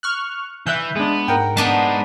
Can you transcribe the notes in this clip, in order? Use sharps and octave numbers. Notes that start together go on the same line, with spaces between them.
C#6 F6 F#6
E3 E5 E6 F#6 G6
G#3 B3 D4
G#2 A#4 F#5 G5
G#3 B3 D4 D#4 A5 B6